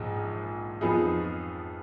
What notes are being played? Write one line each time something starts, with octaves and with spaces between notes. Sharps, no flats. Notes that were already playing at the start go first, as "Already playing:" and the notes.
Already playing: A#1 G#2 F3 G#3 D#4
F2 F3 B3 D#4 G#4